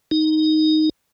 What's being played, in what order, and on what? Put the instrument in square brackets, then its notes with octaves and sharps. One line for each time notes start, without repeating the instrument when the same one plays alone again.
[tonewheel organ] D#4